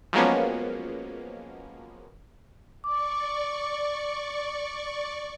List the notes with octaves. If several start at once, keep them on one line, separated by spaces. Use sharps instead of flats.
F3 F#3 G#3 A#3 B3 C#4
D5 C#6 D6